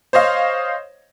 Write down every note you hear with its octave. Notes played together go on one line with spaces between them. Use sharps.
C5 C#5 D#5 F5